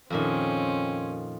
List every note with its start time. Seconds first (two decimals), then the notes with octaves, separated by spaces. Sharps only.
0.10 F2 A#2 D#3 C4 C#4